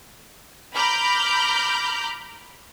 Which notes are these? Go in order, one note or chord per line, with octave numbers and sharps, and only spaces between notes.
A#5 B5 D6 F6 G6